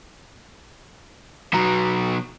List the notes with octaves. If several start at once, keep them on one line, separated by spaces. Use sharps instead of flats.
B2 F#3 A#5